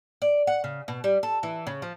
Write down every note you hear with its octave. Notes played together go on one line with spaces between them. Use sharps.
D5
F#5
C#3
B2
G3
A4
E3
C#3
F3